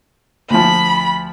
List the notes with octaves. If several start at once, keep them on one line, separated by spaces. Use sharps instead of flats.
D2 F3 B5